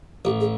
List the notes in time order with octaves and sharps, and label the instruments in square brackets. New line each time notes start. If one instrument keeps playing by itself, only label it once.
[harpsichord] A1 [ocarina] G4
[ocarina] G#4